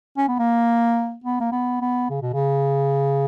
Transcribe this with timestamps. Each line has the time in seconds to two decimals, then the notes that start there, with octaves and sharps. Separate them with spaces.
0.18 C#4
0.29 B3
0.39 A#3
1.24 B3
1.41 A#3
1.52 B3
1.81 B3
2.10 C#3
2.22 B2
2.34 C#3